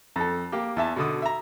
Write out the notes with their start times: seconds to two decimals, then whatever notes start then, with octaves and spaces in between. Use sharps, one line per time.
0.16 F2 A4
0.52 A#3 G4
0.76 E2 E5 A5
0.96 B2 D3 D#6
1.22 E5 A#5